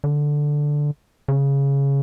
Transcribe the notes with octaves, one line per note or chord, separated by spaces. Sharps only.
D3
C#3